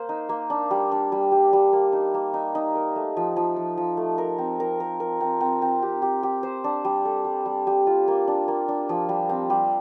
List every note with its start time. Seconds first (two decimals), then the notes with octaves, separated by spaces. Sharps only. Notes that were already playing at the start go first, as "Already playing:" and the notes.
Already playing: A#3 C5
0.09 D#4
0.29 A#3
0.50 D4
0.71 G3
0.92 D4
1.12 G3
1.32 G3
1.53 G3
1.73 A#3
1.93 D#4
2.14 A#3
2.34 D#4
2.55 D#4
2.75 A#4
2.96 A3
3.17 F3
3.36 F3
3.56 F3
3.77 F3
3.97 A3
4.18 A#4
4.38 C4
4.60 A#4
4.80 A#4
5.00 A#4
5.21 C4
5.41 C4
5.62 C4
5.82 G4
6.02 G4
6.23 G4
6.43 C5
6.64 D4
6.85 G3
7.05 A4
7.25 G3
7.46 G3
7.67 G3
7.87 F4
8.08 A#3
8.28 D4
8.48 A#3
8.68 D4
8.89 F3
9.09 G3
9.29 C4
9.50 G3